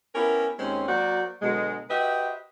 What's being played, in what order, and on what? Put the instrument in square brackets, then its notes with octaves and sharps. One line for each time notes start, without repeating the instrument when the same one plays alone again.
[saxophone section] B3 C#4 E4 G4 A#4
D#2 G#3 C4 C#4
F#3 A#3 F#4 C5 D5
B2 D3 F#3 G#3
F#4 G4 B4 C5 D#5 E5